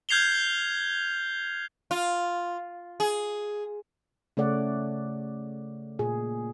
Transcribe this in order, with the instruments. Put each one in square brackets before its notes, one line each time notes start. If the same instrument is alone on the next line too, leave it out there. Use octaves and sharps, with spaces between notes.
[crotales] F6 G6 G#6 C7 F7 G7
[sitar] F4
G#4
[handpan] C#3 A3 C#5 D5 F#5
A#2 G#4